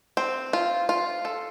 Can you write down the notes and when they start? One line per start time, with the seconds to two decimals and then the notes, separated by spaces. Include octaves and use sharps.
0.17 C4
0.53 F4
0.89 F4
1.25 A4